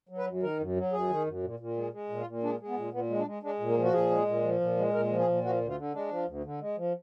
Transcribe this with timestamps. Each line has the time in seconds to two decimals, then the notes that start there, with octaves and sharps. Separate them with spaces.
0.09 F#3
0.18 B4
0.26 F#2
0.43 D#3 A#4
0.59 F#2
0.76 F#3
0.92 F#2 G#4
1.09 D#3
1.26 F#2
1.43 A#2
1.59 A#2
1.76 G#3
1.92 G#3
2.10 A#2
2.18 F4
2.26 A#2
2.43 G#3 D4
2.60 G#3
2.68 B3
2.76 A#2
2.93 A#2 B3
3.10 G#3
3.18 D4
3.26 G#3
3.43 G#3 D4
3.60 A#2
3.68 A#3
3.77 F3
3.84 F#4
3.93 A#2 G#4
4.10 G#3
4.26 A#2
4.43 F3
4.60 A#2
4.77 G#3
4.93 A#2 A#4
5.10 F3
5.19 G#4
5.27 A#2
5.43 F3 F#4
5.61 D2
5.68 F4
5.77 D3
5.94 G#3 D4
6.10 F3
6.27 D2
6.44 D3
6.61 G#3
6.77 F3